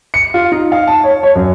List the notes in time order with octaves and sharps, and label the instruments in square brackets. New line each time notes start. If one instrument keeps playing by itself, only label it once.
[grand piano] C#7
F4
D#4
F5
A5
C#5
C#5
F#2